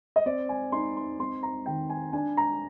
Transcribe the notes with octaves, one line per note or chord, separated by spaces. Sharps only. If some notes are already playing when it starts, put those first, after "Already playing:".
D#5
C4 D5
G#5
D#4 C6
C6
C4 C6
A#5
D#3 G5
G#5
D4 G#5
A#5